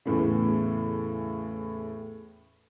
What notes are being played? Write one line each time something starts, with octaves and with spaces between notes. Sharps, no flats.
E2 A2 C#3